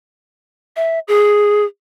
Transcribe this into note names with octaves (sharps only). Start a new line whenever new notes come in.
E5
G#4